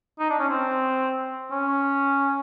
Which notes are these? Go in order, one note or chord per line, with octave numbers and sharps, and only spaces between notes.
D#4
D4
C#4
C4
C#4